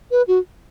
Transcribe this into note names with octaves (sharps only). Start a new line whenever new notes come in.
B4
F#4